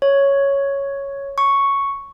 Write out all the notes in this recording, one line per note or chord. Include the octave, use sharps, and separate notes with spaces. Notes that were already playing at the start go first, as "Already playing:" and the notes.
C#5
C#6